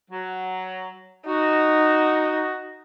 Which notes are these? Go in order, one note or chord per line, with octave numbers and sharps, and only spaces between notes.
F#3
D#4 F#4